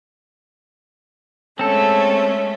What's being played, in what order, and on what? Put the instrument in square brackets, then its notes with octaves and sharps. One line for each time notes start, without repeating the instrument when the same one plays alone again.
[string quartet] G#3 A3 C#4 [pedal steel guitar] C4 A4